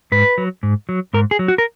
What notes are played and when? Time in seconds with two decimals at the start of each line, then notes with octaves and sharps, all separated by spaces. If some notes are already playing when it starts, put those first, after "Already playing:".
0.12 G#2 B4
0.38 F#3
0.63 G#2
0.89 F#3
1.13 G#2 A#4
1.31 G#4
1.39 F#3
1.48 F#4
1.58 A#4